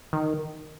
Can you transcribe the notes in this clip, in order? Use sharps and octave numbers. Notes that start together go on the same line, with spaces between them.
D#3